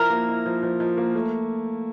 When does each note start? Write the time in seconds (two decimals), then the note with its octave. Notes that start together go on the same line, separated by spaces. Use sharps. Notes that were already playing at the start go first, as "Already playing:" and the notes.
Already playing: F3 E4 A#4
0.10 A#3
0.28 E4
0.46 F3
0.63 F3
0.80 F3
0.97 A#3
1.15 A3